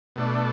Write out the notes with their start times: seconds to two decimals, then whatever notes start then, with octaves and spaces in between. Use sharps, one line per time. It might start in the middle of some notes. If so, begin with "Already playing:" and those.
0.16 B2 A3 D4